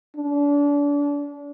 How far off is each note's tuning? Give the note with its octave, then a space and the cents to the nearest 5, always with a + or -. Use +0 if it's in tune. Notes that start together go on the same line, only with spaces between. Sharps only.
D4 -35